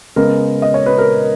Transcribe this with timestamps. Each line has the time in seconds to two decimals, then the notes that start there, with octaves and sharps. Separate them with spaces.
0.16 C#3 G#3 B3 A#4
0.62 D#5
0.74 C#5
0.86 B4
0.98 A#4